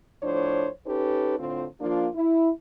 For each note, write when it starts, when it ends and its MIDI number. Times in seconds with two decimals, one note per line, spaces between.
0.22 0.68 45
0.22 0.68 53
0.22 0.68 62
0.22 0.68 72
0.22 0.68 73
0.86 1.38 61
0.86 1.38 63
0.86 1.38 67
0.86 1.38 69
0.86 1.38 71
1.39 1.65 45
1.39 1.65 50
1.39 1.65 60
1.39 1.65 65
1.39 1.65 72
1.80 2.08 53
1.80 2.08 58
1.80 2.08 62
1.80 2.08 65
2.14 2.50 64